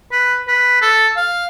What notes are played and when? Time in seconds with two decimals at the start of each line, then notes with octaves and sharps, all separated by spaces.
0.12 B4
0.48 B4
0.82 A4
1.17 F5